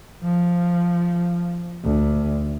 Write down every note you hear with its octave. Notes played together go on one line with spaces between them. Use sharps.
F3
D2